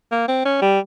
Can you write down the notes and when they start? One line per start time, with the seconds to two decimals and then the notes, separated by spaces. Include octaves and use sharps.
0.12 A#3
0.28 C4
0.45 C#4
0.62 G3